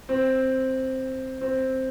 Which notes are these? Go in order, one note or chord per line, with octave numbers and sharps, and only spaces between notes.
C4
C4